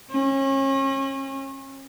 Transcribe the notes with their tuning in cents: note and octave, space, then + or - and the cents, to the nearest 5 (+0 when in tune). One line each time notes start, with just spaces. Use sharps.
C#4 -35